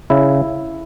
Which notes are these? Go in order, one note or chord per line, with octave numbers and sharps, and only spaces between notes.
C#3 E4